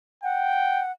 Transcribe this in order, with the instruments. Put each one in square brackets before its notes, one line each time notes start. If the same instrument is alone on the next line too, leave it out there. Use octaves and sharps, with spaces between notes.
[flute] F#5 [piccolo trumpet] G5